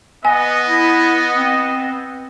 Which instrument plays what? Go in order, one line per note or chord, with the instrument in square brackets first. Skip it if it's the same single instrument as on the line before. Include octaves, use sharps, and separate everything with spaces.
[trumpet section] B3 [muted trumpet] D#5 [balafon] G#5
[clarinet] E4
C4